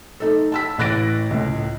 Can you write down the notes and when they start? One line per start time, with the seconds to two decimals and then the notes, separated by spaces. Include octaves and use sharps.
0.20 A3 D#4 A4
0.52 A5 E6 B6
0.78 A1 E3 F#6 A6 A#6 D7
1.31 C#2 A2